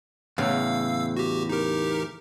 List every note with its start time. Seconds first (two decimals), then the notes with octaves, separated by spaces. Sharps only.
0.38 E2 A2 C#3 F5 E6
1.16 F#4 G4
1.49 D#4 G4 A#4